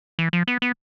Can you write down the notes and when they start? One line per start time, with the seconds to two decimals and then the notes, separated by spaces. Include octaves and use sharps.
0.19 E3
0.33 F3
0.48 B3
0.62 B3